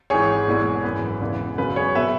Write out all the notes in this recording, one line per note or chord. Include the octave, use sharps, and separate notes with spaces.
G#1 G#2 E3 G#4 C#5
E1 E2 E3 G#3
G#1 F#2 E3 B3 B4
E1 E2 C#3 E3 B3
F#2 C#3 F#3 B3 B4
G#4 C#5
B2 B3 B4 E5